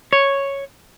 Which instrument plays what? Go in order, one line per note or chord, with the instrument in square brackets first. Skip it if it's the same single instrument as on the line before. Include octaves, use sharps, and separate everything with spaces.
[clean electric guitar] C#5